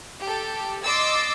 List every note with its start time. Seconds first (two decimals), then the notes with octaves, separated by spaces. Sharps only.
0.20 G4 A4
0.83 D#5 C6 D6 E6 A6